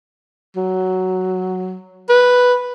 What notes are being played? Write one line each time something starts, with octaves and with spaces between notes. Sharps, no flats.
F#3
B4